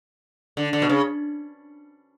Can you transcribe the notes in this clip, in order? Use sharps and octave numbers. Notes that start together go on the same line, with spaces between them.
D3
D3
B2
C#3